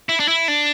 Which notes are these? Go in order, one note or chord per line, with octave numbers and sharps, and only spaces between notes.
E4
D4
E4
D4